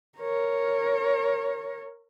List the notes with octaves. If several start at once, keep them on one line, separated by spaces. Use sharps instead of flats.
A#4 C#5